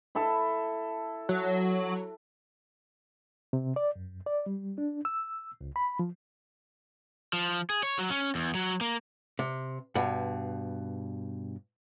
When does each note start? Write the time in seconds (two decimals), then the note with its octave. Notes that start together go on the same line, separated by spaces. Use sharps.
0.15 E4 A4
1.29 F#3
3.53 C3
3.76 D5
3.96 F#2
4.26 D5
4.46 G3
4.78 D4
5.05 E6
5.61 C#2
5.76 B5
5.99 F3
7.33 F3
7.70 G#4
7.83 C#5
7.99 F#3
8.10 C#4
8.35 E2
8.55 F#3
8.81 A#3
9.39 C3
9.95 G2 B2